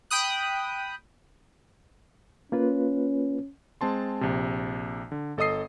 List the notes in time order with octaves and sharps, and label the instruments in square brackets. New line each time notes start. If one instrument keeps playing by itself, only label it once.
[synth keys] G5 B5 D#6 F#6
[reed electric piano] A#3 F4 B4 [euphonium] C#4
[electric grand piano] G#3 C4 A5 C6
A#1 C3
D3
G1 A4 D#5 D#6 C7